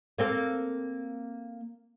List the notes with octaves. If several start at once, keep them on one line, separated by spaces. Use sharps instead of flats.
A#3 C4 A4